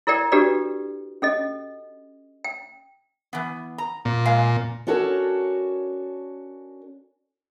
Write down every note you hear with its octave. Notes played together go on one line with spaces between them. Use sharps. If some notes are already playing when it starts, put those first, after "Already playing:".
E4 A4 A#4 D5 G5
D4 F#4 G4 A4 B4 D5
C#4 A4 D#5
G5
E3 B3
A#5
A#2
G#3 F5 G#5
C#4 D4 F#4 A4 A#4 C#5